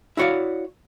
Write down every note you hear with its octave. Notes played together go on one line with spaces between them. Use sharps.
E4 F#4 C#5 D5 F5